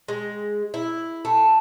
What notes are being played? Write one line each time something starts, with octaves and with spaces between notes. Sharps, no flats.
G#3
E4
A3